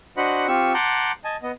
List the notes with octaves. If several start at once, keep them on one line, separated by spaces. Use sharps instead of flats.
D4 F#4 C5 D#5 F#5 B5
C4 F4 G4 C#6 E6
F#5 A5 A#5 C6 D6 G6
D#5 G#5 A5
B3 D#5